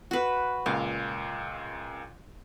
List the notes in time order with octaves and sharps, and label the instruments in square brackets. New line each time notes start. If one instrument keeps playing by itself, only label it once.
[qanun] F#4 B4
[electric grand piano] C#2 A#2 [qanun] F5